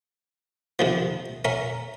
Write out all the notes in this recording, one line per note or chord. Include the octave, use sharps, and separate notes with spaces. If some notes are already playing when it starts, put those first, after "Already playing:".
C3 D#3 F3
C#4 A#4 E5